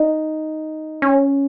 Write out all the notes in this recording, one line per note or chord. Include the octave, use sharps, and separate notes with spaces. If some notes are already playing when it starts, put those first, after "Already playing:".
Already playing: D#4
C#4